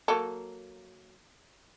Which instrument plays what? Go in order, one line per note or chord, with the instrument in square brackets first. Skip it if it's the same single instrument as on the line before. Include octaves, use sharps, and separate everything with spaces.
[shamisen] F#3 A#3 A4